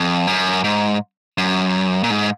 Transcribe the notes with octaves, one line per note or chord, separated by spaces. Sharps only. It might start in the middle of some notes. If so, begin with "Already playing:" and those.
Already playing: F2
F#2
G#2
F#2
A#2
G#2